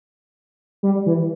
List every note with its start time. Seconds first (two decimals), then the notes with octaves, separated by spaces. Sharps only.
0.83 G3
1.06 E3